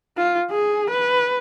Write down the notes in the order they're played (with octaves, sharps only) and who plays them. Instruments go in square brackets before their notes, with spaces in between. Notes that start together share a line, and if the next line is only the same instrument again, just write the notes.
[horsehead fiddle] F4
G#4
B4